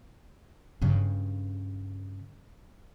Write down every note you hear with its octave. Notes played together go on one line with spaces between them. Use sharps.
G2 C#3